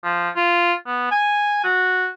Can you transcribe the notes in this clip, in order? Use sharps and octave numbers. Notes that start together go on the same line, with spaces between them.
F3
F4
B3
G#5
F#4